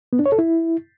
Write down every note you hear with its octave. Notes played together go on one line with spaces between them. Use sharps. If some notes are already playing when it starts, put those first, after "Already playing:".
B3
D4
C#5
A4
E4